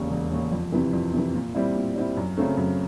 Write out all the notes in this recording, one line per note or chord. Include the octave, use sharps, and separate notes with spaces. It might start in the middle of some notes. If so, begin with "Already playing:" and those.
Already playing: E1 D#2 C#3
E1
D#2 C#3
F2
C3 E3
F2
C3 E3
A#2
G3 C4 E4
A#2
G3 C4 E4
F#2
C#3 F#3 A3 C4
F#2